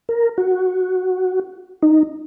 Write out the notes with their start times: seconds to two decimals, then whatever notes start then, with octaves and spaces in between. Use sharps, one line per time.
0.09 A#4
0.38 F#4
1.82 D#4